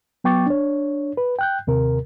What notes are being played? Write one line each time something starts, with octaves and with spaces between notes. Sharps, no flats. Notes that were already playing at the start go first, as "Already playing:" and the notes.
F#3 B3 G5 C#6 D6 A6
D4 C#5
B4
G5 F#6 G6
D#2 C3 A#4